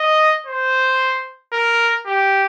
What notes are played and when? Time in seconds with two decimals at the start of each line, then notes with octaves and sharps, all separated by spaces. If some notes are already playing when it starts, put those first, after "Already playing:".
Already playing: D#5
0.47 C5
1.53 A#4
2.06 G4